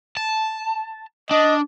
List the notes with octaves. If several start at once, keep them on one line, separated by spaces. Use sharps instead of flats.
A5
D4 D#5